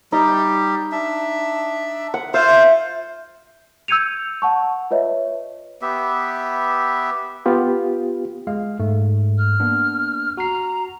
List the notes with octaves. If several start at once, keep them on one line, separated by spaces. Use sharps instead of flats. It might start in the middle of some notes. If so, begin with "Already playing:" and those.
G3 D#4 G4
D4 E5
F#5
F4 C5 E5 F5
E6 G6 G#6 C#7 D#7 F7
F#5 A5 C#6
F4 B4 C#5 D#5 E5
B3 G4 E5
B3 F4 G4
G#3 F5
G#2 A3
F6
A#3 B3 D4
F#4 A#5 C7